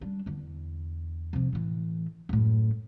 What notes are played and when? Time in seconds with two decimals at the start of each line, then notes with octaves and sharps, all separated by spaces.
0.01 G3 D4
0.26 E2 D3
1.33 C3 F3
1.53 A2 E3
2.29 F#2 A2